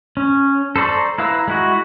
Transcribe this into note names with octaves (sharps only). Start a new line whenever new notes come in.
C#4
A4 C5 D5 A#5 C#6
E4 B4 F5 A#5 E6
G#3 E4 F#4